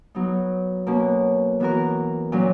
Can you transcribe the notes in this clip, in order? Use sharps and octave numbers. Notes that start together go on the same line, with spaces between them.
F#3 B3 D#4
B2 A#3 C#4 F#4
E3 B3 F#4 A#4
A#2 F#3 C#4